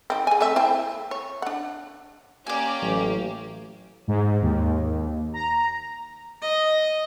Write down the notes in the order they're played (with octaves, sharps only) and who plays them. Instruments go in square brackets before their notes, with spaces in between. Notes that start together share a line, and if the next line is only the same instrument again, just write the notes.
[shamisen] D#3 C4
G#4 G#5
A3 C4 E5
E4 C5 G5
C#5
D4 F#5
[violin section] A#3 C#4 G4 [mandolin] D5 G#5
[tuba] A1 [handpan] F#3
[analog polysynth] G#2
D#2
A#5
[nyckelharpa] D#5